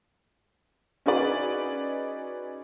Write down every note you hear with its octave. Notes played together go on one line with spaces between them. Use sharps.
C#4 D#4 F#4 G#4 B4 D5